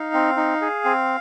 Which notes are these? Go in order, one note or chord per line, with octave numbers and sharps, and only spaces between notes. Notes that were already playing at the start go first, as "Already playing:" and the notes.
Already playing: D#4 F5
C4
D#4
G#4
C4